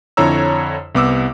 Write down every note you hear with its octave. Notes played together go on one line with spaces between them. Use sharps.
F2 D3 E4 C#5 A#5 E6
C2 B3 D6 E6